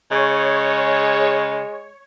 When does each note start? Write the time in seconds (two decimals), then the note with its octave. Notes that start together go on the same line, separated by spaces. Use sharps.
0.11 C#3 G#3 C#5